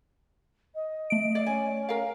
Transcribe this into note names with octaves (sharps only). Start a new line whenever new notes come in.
D#5
A3 D7
D5 F5
C#4 G#5
A#4 F5